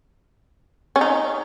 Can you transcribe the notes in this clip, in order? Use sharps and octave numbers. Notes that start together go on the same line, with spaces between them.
C#4
D#4